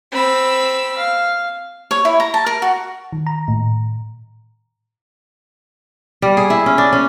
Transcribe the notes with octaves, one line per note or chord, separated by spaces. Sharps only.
C4 B5 E6
F5
C#5
E4
A#5
A5
A#4
F#4
D#3
A#5
A2
G3
G#4
E4
C#4
D4
C#4